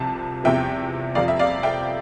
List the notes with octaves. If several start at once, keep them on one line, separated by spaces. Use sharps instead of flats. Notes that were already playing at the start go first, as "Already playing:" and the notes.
Already playing: C2 C3 F3 A5
E2 C3 F3 E5 G5
F2 C3 F3 D5 F5
E5
D5 F5
E5 G5